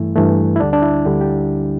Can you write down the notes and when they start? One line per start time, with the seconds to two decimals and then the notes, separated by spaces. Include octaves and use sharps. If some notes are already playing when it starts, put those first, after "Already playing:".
Already playing: G2 E3 A3 E4
0.16 G2 E3 A3
0.56 E4
0.60 D2 D3 G3 D4
0.73 D4
0.82 E4
1.05 D2 D3 G3 G4
1.21 G4